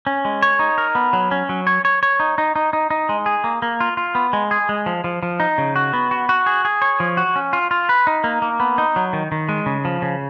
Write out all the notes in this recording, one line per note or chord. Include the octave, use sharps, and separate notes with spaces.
C#4
G#3
C#5
D#4
A#4
B3
F#3
C#4
F#3
C#5
C#5
C#5
D#4
D#4
D#4
D#4
D#4
G#3
G#4
A#3
A#3
F4
F4
B3
G#3
G#4
G#3
F3
F3
F3
D#4
C#3
F#4
B3
F#4
F#4
G#4
G#4
C#5
F3
F#4
C#4
F4
F4
B4
D#4
A#3
A#3
B3
D#4
F#3
D#3
D#3
G#3
C#3
F3
C#3